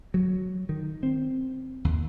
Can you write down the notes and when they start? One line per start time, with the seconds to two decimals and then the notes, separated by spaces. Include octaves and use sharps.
0.14 F#3
0.69 D#3
1.03 C4
1.85 D#2